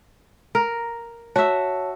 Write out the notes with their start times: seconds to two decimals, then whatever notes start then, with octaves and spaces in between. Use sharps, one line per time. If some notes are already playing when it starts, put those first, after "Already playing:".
0.55 A#4
1.36 F#4 C#5 E5 A5